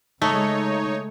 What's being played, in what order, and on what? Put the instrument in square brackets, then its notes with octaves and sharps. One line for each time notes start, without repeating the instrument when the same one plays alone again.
[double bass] C#3 G#3 [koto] A3 [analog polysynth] D#4 C#5